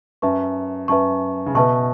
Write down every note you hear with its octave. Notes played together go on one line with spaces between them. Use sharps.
F#2 B4 E5 A5 C#6
F#2 B4 E5 A5 C#6
C#3
B2 B4 E5 A5 C#6